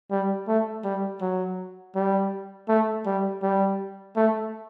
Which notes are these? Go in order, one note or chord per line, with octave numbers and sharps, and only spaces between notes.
G3
A3
G3
F#3
G3
A3
G3
G3
A3